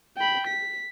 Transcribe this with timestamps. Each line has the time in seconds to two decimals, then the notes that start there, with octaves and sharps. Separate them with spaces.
0.17 G5 B5
0.47 B6